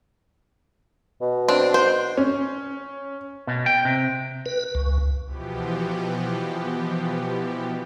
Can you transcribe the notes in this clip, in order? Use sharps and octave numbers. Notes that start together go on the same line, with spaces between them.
B2
C4 D4
C5
C#4
B2
G5
C3
B4
C#2
B2 E3 F3 B3 G4